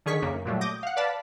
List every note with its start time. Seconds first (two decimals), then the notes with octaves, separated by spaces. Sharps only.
0.06 D3 D#3 G#4 C#6 B6
0.22 F#2 C#3 A#3
0.45 A#2 F#3 G3 A3
0.61 D6 D#6 G6 A#6
0.83 F5 F#5
0.96 B4 D5 F5 A5 B5